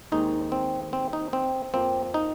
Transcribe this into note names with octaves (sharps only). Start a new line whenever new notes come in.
D#2 D#3 G#3 C4 D#4
C4
C4
D#4
C4
F2 F3 A#3 C4
D#4